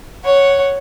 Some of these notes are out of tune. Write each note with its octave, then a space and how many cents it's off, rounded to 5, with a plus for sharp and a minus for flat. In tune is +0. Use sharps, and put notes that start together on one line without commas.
C#5 +0 F#5 +0